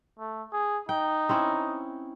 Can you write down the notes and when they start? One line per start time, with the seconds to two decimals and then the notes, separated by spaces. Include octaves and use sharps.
0.19 A3
0.53 G#4
0.89 D#4 G5
1.29 C4 C#4 E4